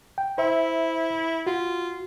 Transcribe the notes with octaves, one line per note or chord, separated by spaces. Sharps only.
G5
E4 C5 E5
F4 F#4